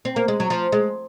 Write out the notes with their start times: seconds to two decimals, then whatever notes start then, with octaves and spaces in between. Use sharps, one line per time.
0.05 C4
0.16 A#3
0.28 G#3
0.40 F#3
0.50 F3
0.72 G#3